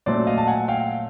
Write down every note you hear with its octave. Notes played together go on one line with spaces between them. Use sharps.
A#2 F#3 A3 C#4 C5 D5
D#5 F5
A5
F#5 G#5
F5 G5